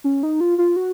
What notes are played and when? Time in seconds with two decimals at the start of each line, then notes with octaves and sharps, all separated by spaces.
0.04 C#4
0.23 D#4
0.41 F4
0.58 F4
0.76 F#4